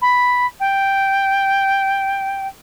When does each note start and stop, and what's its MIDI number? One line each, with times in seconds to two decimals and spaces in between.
0.01 0.46 83
0.59 2.47 79